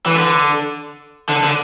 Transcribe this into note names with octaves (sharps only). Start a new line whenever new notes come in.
E3
D3
D3
D3